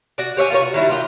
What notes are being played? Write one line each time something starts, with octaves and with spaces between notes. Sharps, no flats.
F#4 D5
G4 C#5 E5 G#5
F4 A#4 C#5
F#4
D#3 F#3 G3 E4
F4 G4 A#4